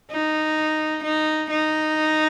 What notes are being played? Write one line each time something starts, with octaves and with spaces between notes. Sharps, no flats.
D#4
D#4
D#4